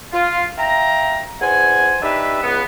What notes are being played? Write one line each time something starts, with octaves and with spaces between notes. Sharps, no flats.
F4
E5 F5 G5 A#5
E2 C5 F#5 G#5
D4 D#4 G4 B4 E5
C#2 B3